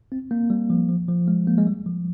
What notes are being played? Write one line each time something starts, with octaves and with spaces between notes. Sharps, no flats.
C4
A#3
G3
F3
F3
F3
G#3
A#3
G#3
G3
F3